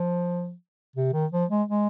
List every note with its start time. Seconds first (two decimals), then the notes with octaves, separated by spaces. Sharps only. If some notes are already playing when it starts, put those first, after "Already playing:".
Already playing: F3
0.96 C3
1.13 D#3
1.32 F3
1.50 G#3
1.68 G#3